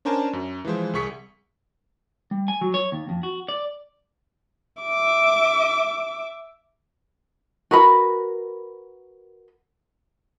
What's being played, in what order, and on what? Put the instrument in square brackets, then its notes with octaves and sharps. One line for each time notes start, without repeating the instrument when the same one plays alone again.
[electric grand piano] C#4 D4 A#4 C5 G#5 A5
F#2
E3 F3 G#3 C5
C2 G#4 C#6 B6 C#7
[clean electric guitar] G3
G#5
F#3
C#5
D#2
F2
F#4
D5
[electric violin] E5 D6
[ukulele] F#4 A#4 B4 B5